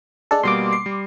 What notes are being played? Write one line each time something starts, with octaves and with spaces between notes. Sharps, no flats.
G#3 D4 A4
B2 G3 A#3 C6 D6
C7
G3